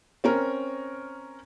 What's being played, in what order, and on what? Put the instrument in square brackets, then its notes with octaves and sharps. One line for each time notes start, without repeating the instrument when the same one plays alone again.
[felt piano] C4 C#4 A#4